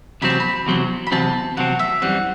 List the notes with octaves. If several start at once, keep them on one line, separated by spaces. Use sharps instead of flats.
E2 C3 F#3 C4 B5
A5
B5
E2 C3 F#3 C4
B5
E2 C3 F#3 C4 A5
E2 C3 F#3 C4 F#5
E5
F#2 E3 G3 C4 F#5